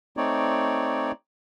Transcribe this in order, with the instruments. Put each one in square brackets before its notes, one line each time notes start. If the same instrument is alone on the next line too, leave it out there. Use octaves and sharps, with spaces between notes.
[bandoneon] A3 C4 D#4 C#5 D5